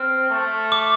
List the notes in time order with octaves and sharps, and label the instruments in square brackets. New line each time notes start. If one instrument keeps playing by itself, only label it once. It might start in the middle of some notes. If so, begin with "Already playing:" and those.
Already playing: [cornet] C4 [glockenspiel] F6
[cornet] A3
[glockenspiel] D6